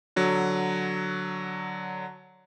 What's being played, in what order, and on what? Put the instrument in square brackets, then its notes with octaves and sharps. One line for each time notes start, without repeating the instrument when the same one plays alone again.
[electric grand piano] D3 F#3